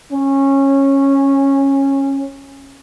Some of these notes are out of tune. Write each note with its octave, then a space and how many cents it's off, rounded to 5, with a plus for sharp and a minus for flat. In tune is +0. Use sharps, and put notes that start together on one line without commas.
C#4 -15